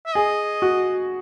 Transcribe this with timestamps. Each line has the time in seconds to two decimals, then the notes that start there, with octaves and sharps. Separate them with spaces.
0.06 E5
0.15 G#4 D#5
0.62 F#4